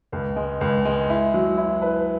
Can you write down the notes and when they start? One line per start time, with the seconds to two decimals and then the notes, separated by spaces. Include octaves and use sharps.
0.12 C#2
0.36 G#3
0.61 C#2
0.85 G#3
1.10 E4
1.34 F#3
1.58 E4
1.82 B4